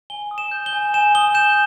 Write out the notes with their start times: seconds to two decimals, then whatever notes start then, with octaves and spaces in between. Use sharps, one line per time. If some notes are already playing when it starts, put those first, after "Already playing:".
0.10 G#5 G7
0.31 D#6
0.38 E7
0.51 G6
0.66 G7
0.73 G#5
0.94 G#5 E7
1.15 D#6 G7
1.34 G6 E7